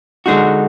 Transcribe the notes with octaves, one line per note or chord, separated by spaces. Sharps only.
D3 G#3 D#4 F#4